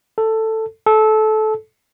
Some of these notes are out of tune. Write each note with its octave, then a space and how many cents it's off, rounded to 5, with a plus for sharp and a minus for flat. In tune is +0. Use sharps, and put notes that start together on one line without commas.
A4 +10
A4 -20